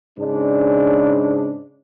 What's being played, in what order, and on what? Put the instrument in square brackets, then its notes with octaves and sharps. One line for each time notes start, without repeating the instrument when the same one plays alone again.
[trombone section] G#2 C#3 D4